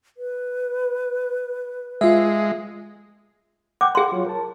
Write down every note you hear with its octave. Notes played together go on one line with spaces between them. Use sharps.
B4
G#3 F4 E5
F#5 G5 D6
G#4 C6
F#3 F4 C#5
A#4 A5